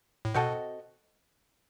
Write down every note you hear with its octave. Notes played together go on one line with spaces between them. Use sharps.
A2
B2 C4 F#4 A4 D#5